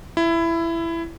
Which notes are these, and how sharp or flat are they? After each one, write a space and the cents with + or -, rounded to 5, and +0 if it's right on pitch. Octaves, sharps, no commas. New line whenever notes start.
E4 +15